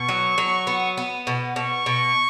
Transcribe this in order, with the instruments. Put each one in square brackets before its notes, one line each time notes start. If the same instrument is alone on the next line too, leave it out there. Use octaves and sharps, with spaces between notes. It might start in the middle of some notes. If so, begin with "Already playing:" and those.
Already playing: [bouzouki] B2 [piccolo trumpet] C#6
[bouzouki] F#3
F#3
B3
B3
B2
[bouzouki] B2 [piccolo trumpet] C#6
[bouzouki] B2